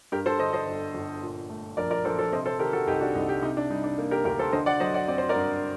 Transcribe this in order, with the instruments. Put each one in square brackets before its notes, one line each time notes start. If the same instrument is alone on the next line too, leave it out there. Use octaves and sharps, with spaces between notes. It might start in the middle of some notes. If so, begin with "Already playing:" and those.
[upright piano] G2 G4 A#4
A4 C5
D3 C5 D#5
C5 D#5
G1
G1
A#2
A3
A#1 A#4 D5
A#4 D5
A#1 A4 C5
A4 C5
C3 C5 D#5
A4 C5
D#3 G4 A#4
F#4 A4
C2 D#4 G4
D4 F#4
C2 D#4
D#4 G4
C3 D#4
D4
G3 D#4
D4
A#3
G4 A#4
D2 G4 A#4
A4 C5
D3 C5 D#5
D5 F#5
F#3 C5 D#5
D5 F#5
C4 D5
C5
A#4 D5
G2